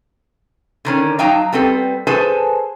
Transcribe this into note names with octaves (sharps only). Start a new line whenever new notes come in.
D3 D#3 C#4
F#3 D#4 F5 G5 A5 A#5
G3 B3 C4 A4
G#4 A4 B4 C5 G#5 A5